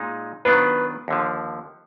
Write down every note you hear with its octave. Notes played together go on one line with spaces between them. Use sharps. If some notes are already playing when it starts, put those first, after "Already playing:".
Already playing: A#2 G#3 D#4
D#3 F#3 B3 D4 F4 B4
D#2 D3 F3